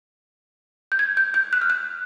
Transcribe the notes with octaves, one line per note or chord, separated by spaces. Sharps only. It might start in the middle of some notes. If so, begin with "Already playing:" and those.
G6
G#6
G6
G6
F#6
F6
F#6